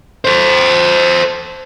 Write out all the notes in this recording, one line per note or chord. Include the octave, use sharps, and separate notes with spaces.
A4 C5